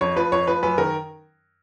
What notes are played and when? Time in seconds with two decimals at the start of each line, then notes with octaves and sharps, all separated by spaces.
0.01 F2 C#5
0.16 F3 B4
0.32 F2 C#5
0.47 F3 B4
0.63 F#2 B4
0.78 D#3 A#4